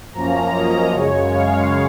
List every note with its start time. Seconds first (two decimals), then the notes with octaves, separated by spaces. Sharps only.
0.13 F#2 F3 A#3 C#4 A#5
0.54 D#5
0.92 F#2 C#3 G#3 C#5
1.32 F5